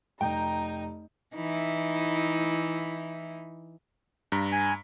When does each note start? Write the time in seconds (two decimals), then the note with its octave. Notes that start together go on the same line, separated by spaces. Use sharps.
0.21 F1 D#4 G5 A#5
1.35 E3 D#4 E4
4.32 G2 A#5 B6
4.52 G#5